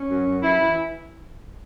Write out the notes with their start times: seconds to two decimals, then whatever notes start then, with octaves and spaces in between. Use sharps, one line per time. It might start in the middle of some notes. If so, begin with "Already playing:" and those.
Already playing: C#4
0.10 F#2
0.26 F#2
0.43 F#2 E4
0.59 E3